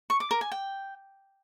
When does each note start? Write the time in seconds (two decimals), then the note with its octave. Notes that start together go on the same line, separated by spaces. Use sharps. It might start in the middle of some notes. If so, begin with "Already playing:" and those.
0.10 C#6
0.20 D6
0.31 A#4
0.41 G#5
0.52 G5